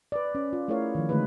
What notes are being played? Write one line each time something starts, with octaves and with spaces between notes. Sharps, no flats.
B4 D5
C#4
F4
A3 E4 G#4 A#4 C#5 F5
D#3 F3
D3 G#3 A3 D#4 G#4 B4